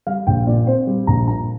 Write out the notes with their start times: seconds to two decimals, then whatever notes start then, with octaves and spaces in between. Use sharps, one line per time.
0.07 G3 F5
0.27 A#1 G5
0.47 A#2 D5
0.67 C4 C5
0.87 G3
1.07 A#1 A#5
1.28 A#2 A#5